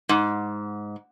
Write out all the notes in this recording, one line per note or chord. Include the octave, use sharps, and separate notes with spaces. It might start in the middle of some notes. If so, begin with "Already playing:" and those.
G#2